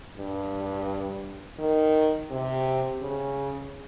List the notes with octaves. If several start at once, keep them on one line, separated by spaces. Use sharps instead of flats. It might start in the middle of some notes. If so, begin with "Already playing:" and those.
G2
D#3
C3
C#3